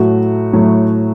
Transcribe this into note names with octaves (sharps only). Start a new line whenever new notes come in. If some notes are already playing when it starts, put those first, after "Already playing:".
Already playing: A2 F#3 A3 F#4
A2 F#3 A3